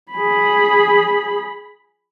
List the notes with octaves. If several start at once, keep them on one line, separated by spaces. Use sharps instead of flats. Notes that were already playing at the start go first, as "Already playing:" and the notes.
G#4 B5